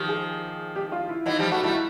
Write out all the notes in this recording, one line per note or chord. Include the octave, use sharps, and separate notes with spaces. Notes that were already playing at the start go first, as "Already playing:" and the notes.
Already playing: D#3 F3 G4
G#4
G4
F4
E4
E3 F#3 D#4
F3 G3 G4
G3 A3 F#4
G3 A3 E4